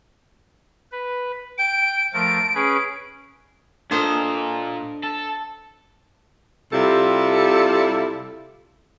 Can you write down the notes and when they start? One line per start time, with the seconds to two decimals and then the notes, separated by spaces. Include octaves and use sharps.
0.92 B4
1.58 G5 D7
2.14 F3 A3 A#4 D7
2.55 C#4 G#4 B4
3.91 A#2 D4 A4 A#4 C5 D#5
5.03 A4
6.72 C3 G3 E4 F4 A4